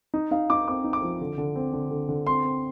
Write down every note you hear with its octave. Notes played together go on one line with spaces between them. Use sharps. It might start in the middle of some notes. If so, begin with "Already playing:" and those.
D#4
D#4 F5
D#4 D6
C4 D6
D#4
D6
F3
D3
D3
C4
D3
D3
D3
C4 C6
C4